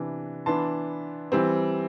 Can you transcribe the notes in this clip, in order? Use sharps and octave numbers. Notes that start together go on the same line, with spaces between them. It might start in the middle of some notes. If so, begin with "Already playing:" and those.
Already playing: C3 E3 B3 D4
E3 B3 D4 A5 C6
E3 G3 C4